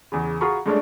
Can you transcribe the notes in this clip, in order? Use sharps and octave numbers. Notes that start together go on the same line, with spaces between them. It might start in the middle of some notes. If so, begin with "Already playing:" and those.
E2 C#3
F4 F#4 G#4 A#5 B5 C#6
G2 G#3 A3 C#4 D4